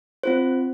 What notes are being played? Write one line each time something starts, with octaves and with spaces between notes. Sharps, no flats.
C4 F4 C5